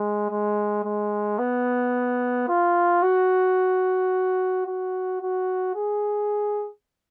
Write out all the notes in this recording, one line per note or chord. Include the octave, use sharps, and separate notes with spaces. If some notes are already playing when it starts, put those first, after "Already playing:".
Already playing: G#3
G#3
G#3
B3
F4
F#4
F#4
F#4
G#4